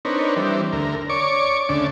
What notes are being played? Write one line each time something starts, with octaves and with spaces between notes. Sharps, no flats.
C4 D4 D#4 A#4 B4 C#5
E3 G3 C4 D4
D2 A#4
C#5 D5 C#6 D6
D2 C#3 D4 D5